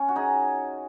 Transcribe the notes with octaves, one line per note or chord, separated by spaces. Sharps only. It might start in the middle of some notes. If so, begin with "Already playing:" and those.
Already playing: C#4
F#4
D#4 G#4